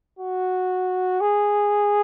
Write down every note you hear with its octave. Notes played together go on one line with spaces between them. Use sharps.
F#4
G#4